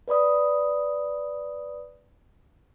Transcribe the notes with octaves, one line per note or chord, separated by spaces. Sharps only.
B4 D5 B5 D#6